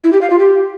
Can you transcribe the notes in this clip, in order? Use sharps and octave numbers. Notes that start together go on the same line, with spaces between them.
E4
G4
F5
F4
G4